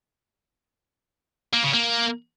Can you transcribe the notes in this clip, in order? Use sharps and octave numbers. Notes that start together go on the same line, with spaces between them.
A#3
C#3
A#3